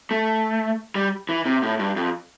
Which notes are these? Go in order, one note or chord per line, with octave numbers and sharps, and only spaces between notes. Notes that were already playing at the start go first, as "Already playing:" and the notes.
A3
G3
E3
C3
A2
G2
F2